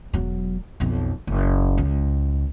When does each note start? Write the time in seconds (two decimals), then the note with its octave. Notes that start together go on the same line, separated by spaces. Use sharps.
0.13 E1 F#3
0.80 B1 F2
1.27 F#1
1.78 C#2